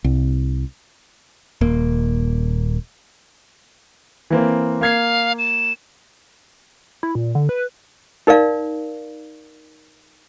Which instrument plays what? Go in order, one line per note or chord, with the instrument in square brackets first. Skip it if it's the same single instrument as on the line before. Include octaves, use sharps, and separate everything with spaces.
[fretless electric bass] C2
[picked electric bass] D#1 A#3
[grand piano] E3 A#3 C4
[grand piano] A#3 G#6 C7 [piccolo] F5
[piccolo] E7
[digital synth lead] E4
A#2
D3
B4
[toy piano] D#4 A#4 D5 F5